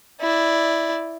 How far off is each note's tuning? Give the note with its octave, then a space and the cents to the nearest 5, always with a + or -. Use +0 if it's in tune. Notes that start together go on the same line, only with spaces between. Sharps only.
E4 +0 D5 +0